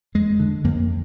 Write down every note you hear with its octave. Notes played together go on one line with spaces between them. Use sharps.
F2 G#3
D3
F2 A#3